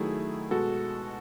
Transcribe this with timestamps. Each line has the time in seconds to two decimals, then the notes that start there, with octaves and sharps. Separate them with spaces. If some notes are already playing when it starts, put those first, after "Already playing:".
Already playing: D#3 F#3 A3 E4 G#4
0.51 B2 G#3 F#4 A4